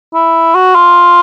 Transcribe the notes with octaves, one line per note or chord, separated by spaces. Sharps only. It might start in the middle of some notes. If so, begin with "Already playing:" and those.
E4
F#4
F4